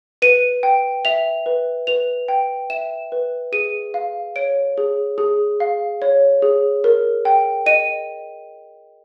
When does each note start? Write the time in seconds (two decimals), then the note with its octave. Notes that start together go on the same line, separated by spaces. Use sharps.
0.22 B4 D#7
0.63 G5
1.05 E5 F7
1.46 B4
1.87 B4 F7
2.28 G5
2.70 E5 E7
3.12 B4
3.52 G#4 D#7
3.94 F5
4.36 C#5 D7
4.78 G#4
5.18 G#4
5.60 F5
6.02 C#5
6.42 G#4
6.84 A#4
7.25 G5
7.66 D#5 D#7